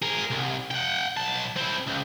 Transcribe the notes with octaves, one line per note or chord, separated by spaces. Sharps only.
G#4 A#4
C2
F#5 G5
B1 A5
C4 E4
C#2